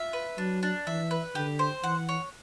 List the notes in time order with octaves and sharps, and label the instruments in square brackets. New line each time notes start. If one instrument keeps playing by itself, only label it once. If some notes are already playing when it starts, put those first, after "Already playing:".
Already playing: [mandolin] F4 E5
B4
[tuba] F#3 [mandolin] D4
[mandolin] D4
[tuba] E3 [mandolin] E5
[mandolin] B4
[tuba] D3 [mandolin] G4
[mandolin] C5
[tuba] E3 [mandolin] F#5
[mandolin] C#5